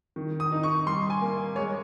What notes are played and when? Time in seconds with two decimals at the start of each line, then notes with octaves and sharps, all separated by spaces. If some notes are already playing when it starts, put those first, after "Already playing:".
0.16 D#3
0.40 D#6
0.52 D#4
0.63 C#6
0.86 G3 C6
1.10 G#5
1.21 A#3
1.56 G#3 C#5